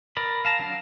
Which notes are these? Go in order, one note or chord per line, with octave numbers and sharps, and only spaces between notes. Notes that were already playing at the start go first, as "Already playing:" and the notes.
A#4 D5 B5
F5 A5 A#5
F#3 D4 F5